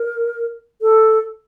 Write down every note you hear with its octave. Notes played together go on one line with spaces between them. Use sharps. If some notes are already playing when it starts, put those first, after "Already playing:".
Already playing: A#4
A4